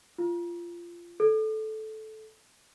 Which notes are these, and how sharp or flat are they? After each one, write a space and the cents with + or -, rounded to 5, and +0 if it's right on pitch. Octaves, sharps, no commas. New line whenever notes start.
F4 -20
A4 -15